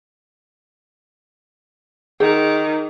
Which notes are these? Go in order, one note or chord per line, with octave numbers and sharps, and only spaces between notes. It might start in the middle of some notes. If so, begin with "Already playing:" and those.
D#3 G#4